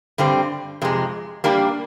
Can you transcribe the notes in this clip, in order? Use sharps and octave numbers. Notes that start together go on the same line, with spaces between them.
G2 D3 G3 C4
F2 C3 G#3
G3 A#3 D4 G4 A#4